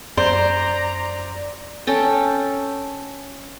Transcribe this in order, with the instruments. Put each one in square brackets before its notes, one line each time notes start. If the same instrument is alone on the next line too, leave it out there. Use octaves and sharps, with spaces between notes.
[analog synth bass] F#2 [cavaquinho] C5 [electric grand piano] D5 [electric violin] A#5
[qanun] C#4 A4 G5